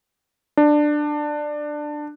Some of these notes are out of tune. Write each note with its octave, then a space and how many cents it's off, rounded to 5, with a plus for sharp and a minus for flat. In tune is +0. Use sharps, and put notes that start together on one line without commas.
D4 +15